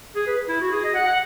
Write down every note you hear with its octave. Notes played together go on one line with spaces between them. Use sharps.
G#4
B4
E4
F#4
G#4
D#5
F#5
F#5